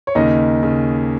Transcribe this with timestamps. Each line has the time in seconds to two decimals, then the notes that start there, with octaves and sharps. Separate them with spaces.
0.07 C#5
0.15 D#2 C#3 D#4 D#5
0.63 C#3